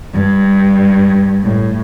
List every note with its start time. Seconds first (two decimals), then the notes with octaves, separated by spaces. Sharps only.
0.14 G2
1.43 A2